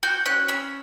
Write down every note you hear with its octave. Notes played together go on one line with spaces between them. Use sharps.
F#4 G6
C#4 F#6
C#4 E6